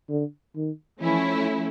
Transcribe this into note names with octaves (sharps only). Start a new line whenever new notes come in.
D3
D#3
E3 F3 A3 C#4 E4